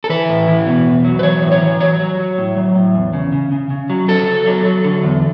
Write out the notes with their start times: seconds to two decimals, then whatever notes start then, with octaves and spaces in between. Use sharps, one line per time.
0.04 A4
0.10 E3 B4
0.29 A2
0.48 E3
0.67 B2
0.85 E2
1.05 F#3
1.19 B4
1.23 E3 C#5
1.43 A2
1.52 C#5
1.62 E3
1.80 F#3 C#5
2.00 F#3
2.19 F#3
2.38 A2
2.57 F#3
2.75 A2
2.95 E2
3.13 C#3
3.33 C#3
3.52 C#3
3.70 C#3
3.90 F#3
4.08 F#3 A4
4.27 F#3
4.46 F#3
4.65 F#3
4.84 D3
5.03 E2